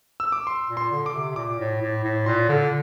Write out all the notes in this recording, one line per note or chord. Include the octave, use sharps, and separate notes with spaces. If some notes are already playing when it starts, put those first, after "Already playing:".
E6
D6
C6
A#2
C6
D3
D6
C3
C3
A#2 D6
A2
A2
A2
A#2 C6
D3